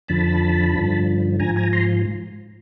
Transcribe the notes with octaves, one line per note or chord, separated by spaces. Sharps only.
F2 D3 F3 A5 B5
G2 D3 F3
G#2 F3 G#5 A#5
G#5 A#5
A#5 C6